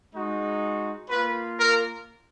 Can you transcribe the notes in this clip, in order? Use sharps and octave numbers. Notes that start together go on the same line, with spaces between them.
G#3 D#4 F#4
A#3 F4 B4
A#4